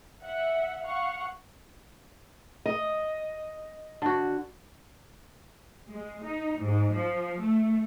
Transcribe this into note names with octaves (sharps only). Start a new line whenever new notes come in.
E5 F#5
F5 F#5 C#6
D#5
D3 F#4
G#3
D#4
G#2
F3
A3